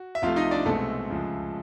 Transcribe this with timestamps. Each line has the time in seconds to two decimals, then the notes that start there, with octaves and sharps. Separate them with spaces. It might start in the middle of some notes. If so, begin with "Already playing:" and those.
Already playing: F#4
0.15 E5
0.22 C2 C3 F3 A3 F4 F5
0.36 D#4 D#5
0.51 D4 D5
0.65 C2 B2 G#3 A3 C4 A4
1.10 C#2 C#3 F3 G#3